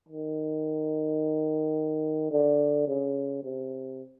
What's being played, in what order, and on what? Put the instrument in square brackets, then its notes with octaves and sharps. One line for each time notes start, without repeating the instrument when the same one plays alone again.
[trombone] D#3
D3
C#3
C3